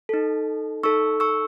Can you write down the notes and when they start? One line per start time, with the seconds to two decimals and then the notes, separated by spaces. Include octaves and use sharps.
0.09 D#4 A4
0.83 D#4 A4 C#6 E6
1.20 C#6 E6